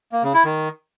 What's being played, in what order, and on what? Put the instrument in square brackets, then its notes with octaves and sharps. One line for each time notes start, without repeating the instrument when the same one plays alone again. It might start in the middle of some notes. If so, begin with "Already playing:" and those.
[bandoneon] A#3
C#3
E4
D#3